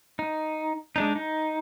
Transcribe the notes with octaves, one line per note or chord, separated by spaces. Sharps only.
D#4
G#3 D4 D#4
D#4